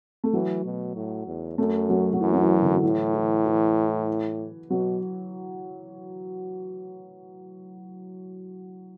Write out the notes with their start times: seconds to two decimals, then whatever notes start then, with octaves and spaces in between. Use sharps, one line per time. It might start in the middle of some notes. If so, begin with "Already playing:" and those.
0.24 A3
0.33 E3 F#3
0.65 B2
0.96 A2
1.27 E2
1.58 F#2 A3
1.89 F#3
2.13 F#3
2.20 F#2 E3
2.33 F#3
2.42 E3
2.62 D3
2.74 F#3
2.83 A2 E3
3.14 E3
3.46 E3
4.70 B2 F#3